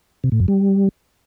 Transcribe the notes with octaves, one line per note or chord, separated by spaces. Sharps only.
C3
A2
F#2
G3